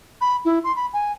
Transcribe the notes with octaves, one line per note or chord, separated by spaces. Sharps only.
B5
E4
C6
B5
G#5